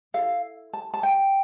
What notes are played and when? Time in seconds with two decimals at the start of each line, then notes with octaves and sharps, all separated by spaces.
0.14 E4 A4 F5
0.73 A5
0.94 A5
1.03 G5